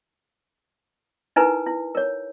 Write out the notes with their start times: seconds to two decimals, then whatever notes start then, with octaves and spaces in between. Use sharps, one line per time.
1.36 D#4 E4 A#4 B4 G#5 A#5
1.66 E4
1.95 A#4 C#5